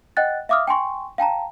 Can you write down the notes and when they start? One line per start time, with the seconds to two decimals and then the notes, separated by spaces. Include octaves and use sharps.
0.17 D#5 F#5 G5 F#6 A6
0.49 E5 F5 D6 D#6 F6
0.68 G5 G#5 C6 C#6
1.18 F5 G5 A5 A#5